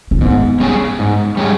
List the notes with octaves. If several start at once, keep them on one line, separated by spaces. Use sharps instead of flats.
C#4
G#2 B3
G3 C#4 G#4
G#2
G3 C#4 G#4